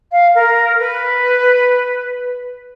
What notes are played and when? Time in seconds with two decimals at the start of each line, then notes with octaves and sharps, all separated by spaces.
0.12 F5
0.35 A#4
0.79 B4